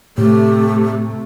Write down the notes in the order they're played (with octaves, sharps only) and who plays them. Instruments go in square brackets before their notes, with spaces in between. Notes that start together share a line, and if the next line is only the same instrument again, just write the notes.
[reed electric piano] A2 [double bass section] C3 A3 [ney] G4